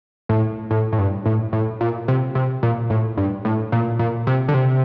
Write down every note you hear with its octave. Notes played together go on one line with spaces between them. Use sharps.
A2
A2
A2
G2
A2
A2
A#2
C3
C3
A#2
A2
G2
A2
A#2
A#2
C3
D3
C3